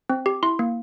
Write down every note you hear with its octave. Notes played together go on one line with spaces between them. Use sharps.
C4
G4
E4 C6
A#3